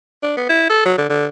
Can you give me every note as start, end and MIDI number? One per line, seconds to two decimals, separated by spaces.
0.23 0.35 62
0.37 0.48 59
0.49 0.68 64
0.70 0.81 69
0.85 0.93 54
0.98 1.06 50
1.10 1.26 50